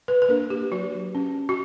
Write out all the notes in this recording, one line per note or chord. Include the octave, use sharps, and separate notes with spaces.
B4
B4
A#3 D4 A#4
G4
F#3 F#4
C#4
F#4